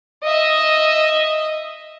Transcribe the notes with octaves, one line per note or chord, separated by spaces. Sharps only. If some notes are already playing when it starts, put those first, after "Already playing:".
D#5 E5